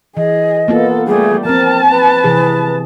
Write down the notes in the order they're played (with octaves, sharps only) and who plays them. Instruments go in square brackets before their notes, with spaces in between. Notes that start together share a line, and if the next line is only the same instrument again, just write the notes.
[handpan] E3 [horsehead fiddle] G#4 [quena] D#5
[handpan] A#3 B3 F4 [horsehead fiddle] A4
[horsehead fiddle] G3 A3 [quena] G#4
[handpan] F3 C4 [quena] A#4 [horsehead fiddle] A5
[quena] B4
[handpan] C3 E3 G#4